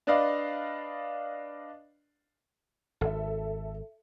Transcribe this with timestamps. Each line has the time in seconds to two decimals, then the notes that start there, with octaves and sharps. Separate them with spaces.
0.07 D4 B4 D5 D#5 F5
3.01 G#1 A4 E5